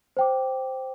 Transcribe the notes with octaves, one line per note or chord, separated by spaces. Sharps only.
C5 G5 D6